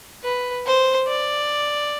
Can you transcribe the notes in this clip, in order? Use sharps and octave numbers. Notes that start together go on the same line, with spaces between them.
B4
C5
D5